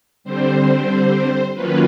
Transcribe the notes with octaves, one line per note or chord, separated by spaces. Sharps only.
D3 G3 C4 C5
D#3 F#3 A#3 C#4 F4 B4